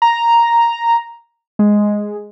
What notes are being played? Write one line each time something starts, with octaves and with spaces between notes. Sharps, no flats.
A#5
G#3